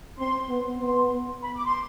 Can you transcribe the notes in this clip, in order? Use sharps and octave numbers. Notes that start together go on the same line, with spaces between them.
C4 C6
B3
B3 C6
B5
D6
C6